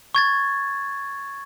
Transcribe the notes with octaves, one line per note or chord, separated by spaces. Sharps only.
C#6 G#6 A6